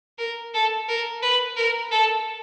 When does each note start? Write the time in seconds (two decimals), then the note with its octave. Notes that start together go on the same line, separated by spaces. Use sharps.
0.18 A#4
0.54 A4
0.88 A#4
1.22 B4
1.57 A#4
1.91 A4